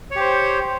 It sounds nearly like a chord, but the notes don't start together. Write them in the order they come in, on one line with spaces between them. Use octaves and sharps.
C#5 G4 C5